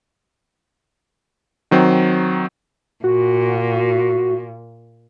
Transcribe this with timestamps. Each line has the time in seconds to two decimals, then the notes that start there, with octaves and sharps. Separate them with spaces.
1.71 D#3 F#3 C4
3.04 A#2 F#4